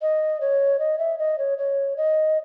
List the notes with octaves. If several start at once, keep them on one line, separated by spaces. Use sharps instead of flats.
D#5
C#5
D#5
E5
D#5
C#5
C#5
D#5